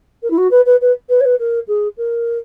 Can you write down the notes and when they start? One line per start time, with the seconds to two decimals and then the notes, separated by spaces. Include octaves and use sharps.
0.23 A#4
0.30 E4
0.37 F#4
0.51 B4
0.66 B4
0.81 B4
1.09 B4
1.20 C#5
1.25 B4
1.39 A#4
1.68 G#4
1.98 A#4